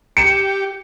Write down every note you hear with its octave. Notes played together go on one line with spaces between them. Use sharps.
G4 C#7 E7